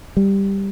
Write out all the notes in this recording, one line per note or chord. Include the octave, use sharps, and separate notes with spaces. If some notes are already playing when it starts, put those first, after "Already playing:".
G3